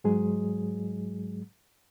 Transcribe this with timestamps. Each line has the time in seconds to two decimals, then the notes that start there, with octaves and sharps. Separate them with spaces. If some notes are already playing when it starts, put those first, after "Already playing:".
0.04 G#2 F#3 G#3 G#4